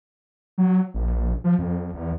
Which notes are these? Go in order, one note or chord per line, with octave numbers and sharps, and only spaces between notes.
F#3
A#1
F3
F2
E2